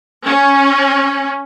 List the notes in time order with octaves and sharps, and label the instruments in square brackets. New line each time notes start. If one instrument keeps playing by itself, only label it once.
[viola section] C#4